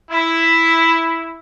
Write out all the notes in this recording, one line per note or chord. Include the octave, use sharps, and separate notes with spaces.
E4